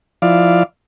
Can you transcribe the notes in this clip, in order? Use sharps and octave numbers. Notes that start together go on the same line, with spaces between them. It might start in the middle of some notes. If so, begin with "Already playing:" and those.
F3 E4 D5 F5